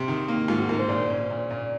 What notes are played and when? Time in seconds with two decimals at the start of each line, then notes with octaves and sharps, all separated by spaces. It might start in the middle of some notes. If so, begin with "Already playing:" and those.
Already playing: C3
0.08 D#3
0.28 A#3
0.48 G#2 F4
0.59 F#4
0.69 G#2 A#4
0.79 C5
0.89 A#2
1.10 C#4
1.30 A#2
1.50 A#2